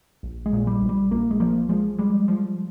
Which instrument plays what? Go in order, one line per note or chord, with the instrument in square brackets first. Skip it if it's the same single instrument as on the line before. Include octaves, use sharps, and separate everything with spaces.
[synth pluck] A#1
[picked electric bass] G#3
[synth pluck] A#2
[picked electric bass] G3
[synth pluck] A#1
[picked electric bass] G3
[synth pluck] A#1 [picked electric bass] A#3
[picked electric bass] G#3
[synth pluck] F3 [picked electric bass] A#3
[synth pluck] F3 [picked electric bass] G#3
[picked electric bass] G3 [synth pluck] G#3
[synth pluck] F3